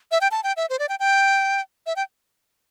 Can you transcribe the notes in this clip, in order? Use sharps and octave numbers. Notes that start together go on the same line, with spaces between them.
E5
G5
A5
G5
E5
C5
D5
G5
G5
E5
G5